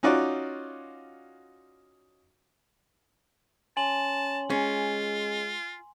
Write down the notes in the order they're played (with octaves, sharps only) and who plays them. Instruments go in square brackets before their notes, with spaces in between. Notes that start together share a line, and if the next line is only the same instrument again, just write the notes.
[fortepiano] C#4 D#4 F4 F#4 D5
[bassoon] C#4 [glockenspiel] G#5 C6 F#7 [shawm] A5
[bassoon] G#3 [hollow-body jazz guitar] C#4 [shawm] F4